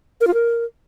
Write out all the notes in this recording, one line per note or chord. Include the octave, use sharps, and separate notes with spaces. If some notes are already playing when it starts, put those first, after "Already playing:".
A#4
F4
A#4